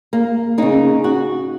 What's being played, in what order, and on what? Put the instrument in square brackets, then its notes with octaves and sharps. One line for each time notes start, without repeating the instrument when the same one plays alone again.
[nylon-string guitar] A#3
C#3 A#3 D#4
F#4